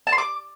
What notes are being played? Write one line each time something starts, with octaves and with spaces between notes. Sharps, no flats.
A5
C6
D6